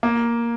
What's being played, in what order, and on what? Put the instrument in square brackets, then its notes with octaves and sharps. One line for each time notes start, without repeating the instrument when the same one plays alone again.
[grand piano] A#3